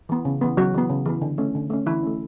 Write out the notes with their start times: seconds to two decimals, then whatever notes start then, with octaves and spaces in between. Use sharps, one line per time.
0.09 E3 B3
0.25 C#3
0.41 E3 B3
0.57 C#3 F#3 F#4
0.74 E3 B3
0.90 C#3
1.06 E3 B3
1.22 D3
1.38 A3 C#4
1.55 D3
1.70 A3 C#4
1.86 D3 E3 E4
2.03 A3 C#4